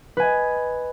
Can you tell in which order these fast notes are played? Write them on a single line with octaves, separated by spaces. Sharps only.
B4 G#5 D#5